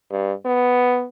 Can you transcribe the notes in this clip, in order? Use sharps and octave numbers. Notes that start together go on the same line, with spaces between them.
G2
B3